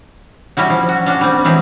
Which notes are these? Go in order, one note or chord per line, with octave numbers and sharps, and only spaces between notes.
G3 C#4 E4 F#4
F3
F#4
C#4 D4 F#4
G3 C4
E3 F#3 G#3 C4